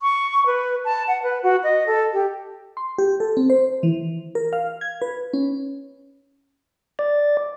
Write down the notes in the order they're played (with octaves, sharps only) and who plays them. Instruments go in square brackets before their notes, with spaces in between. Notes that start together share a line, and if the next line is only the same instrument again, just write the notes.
[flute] C#6
B4
A5
F#5
B4
F#4
D#5
A4
G4
[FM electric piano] C6
G4
A4
C4
C5
E3
A#4
F5
G#6
B4
C#4
[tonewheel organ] D5